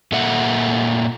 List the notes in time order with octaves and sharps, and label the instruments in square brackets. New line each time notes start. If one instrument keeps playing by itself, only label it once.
[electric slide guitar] A#2 A4 E5 F#5